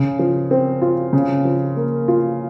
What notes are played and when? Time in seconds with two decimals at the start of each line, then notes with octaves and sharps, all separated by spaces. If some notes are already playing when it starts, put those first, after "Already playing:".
Already playing: C#3
0.19 F3
0.51 C4
0.82 F4
1.13 C#3
1.45 F3
1.76 A#3
2.08 F4